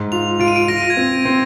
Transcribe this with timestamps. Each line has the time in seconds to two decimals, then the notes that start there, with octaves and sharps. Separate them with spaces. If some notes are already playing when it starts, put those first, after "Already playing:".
Already playing: G#2
0.12 F4 F7
0.40 F4 D7
0.48 D#7
0.56 D7
0.68 F4 A#6
0.90 G#6
0.97 C4
1.25 C4